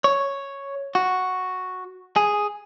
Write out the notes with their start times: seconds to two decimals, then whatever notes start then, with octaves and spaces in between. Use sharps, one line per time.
0.04 C#5
0.95 F#4
2.16 G#4